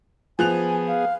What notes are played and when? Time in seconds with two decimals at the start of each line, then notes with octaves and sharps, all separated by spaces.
0.39 F3 B3 G#4 G#5 F#6 F7
0.87 F5